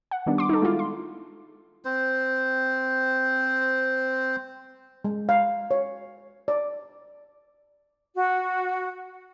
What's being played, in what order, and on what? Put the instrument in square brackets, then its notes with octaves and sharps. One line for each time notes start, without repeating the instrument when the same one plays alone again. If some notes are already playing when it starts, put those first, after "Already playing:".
[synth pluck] F#5
D#3 G3 B3 D4
C6 D6
D#4 A4
G#3 E4 F4
C6
[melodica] C4 C5
[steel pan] G#3
F5
C#5
D5
[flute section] F#4